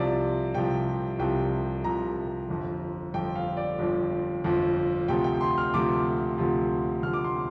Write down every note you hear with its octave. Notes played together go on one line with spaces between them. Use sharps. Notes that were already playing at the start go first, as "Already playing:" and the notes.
Already playing: C2 C3 F3 D5
C2 C3 F3 G5
C2 C3 F3 G5
C2 C3 F3 A#5
G1 F2 F3
G1 F2 F3 G5
F5
D5
G1 F2 F3
G1 F2 F3
D2 C3 F3 G5
G5
C6
F6
D2 C3 F3 D6
D2 C3 F3
D2 C3 F3 F6
D6
C6